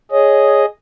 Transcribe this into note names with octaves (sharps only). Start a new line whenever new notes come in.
G#4 C#5 D#5